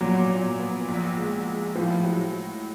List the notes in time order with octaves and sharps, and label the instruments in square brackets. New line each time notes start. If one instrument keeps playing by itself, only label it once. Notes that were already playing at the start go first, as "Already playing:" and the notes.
[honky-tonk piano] A#2 [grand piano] F#3
[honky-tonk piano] A#2
B3
A#1
G#3
G#3
[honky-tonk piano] A2 [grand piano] F3
[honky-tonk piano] F#3